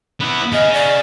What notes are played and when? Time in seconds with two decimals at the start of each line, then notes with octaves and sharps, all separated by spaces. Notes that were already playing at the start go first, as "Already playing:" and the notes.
0.21 B3 E4
0.52 G#4 D#5 F5
0.74 D5